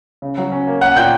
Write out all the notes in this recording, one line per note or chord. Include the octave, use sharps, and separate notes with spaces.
C#3
F#3
C#4
A#3
C#4 F#5 F#6
A#2 G5 G6